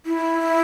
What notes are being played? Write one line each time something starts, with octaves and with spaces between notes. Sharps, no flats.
E4